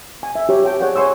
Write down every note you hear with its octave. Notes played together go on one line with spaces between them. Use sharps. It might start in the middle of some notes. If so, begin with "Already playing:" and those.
G#5
E5
G4 C#5
C#5 G5 A5
G#4 C#5 D5 F#5 G5
C#5 G#5 C6 C#6 E6